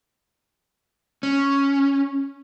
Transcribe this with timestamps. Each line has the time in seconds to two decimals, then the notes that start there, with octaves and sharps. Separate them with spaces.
1.23 C#4